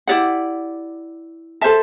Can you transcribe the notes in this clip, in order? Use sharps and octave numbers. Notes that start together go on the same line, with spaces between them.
E4 G4 D5 F#5
A4 C5 E5 A5